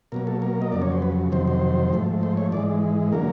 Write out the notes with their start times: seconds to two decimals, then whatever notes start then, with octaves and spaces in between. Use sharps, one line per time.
0.12 B2 F#3 A#3 A#4
0.27 A4
0.42 A#4
0.62 D#5
0.72 F2 C#3 F#3 D5
0.82 C#5
0.92 C5
1.02 B4
1.32 F2 C3 D#3 F#3 C5
1.47 C5
1.93 G#2 F3 A3
2.23 C5
2.37 C#5
2.52 G#2 E3 G#3 D5
3.12 D3 F#3 A#3 A#4